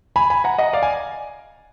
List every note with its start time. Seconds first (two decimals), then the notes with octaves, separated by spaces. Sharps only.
0.16 G#5 B5
0.30 G#5 B5
0.44 F#5 A#5
0.58 D#5 F#5
0.73 D5 F5
0.83 G#5